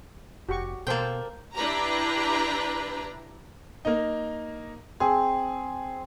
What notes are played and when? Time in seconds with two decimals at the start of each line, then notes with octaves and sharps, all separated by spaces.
0.49 F1 F#4 G4 C#6
0.87 B2 A#3 A4 C5 G5 A5
1.55 D4 E4 G4 B4 A#5
3.85 A#3 D#4
5.00 C4 G#4